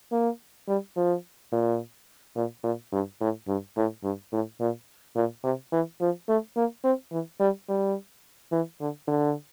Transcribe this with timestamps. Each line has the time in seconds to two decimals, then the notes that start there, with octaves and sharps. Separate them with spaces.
0.12 A#3
0.68 G3
0.96 F3
1.52 A#2
2.35 A#2
2.63 A#2
2.92 G2
3.21 A2
3.47 G2
3.77 A2
4.03 G2
4.32 A2
4.60 A#2
5.16 A#2
5.43 C3
5.72 E3
6.01 F3
6.28 A3
6.56 A#3
6.84 C4
7.11 E3
7.40 G3
7.68 G3
8.52 E3
8.81 D3
9.07 D3